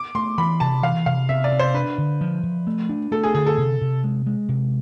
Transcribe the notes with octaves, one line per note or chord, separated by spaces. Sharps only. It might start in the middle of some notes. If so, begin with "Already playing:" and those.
Already playing: D6
A3 C6
E3 B5
C3 A5
E3 F5
C3 F5
C3 E5
D5
C3
C5
D4 B4
D3
F3
F3
A3
D4
A3 A4
G#4
D3 G#4
A4
C3
C3
G#3
G#3
C3